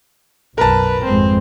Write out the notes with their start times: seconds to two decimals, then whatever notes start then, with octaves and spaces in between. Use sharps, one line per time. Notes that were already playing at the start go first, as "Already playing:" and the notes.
0.58 B1 F#2 A#4 B4 A5
1.05 G#1 F2 G#3 C4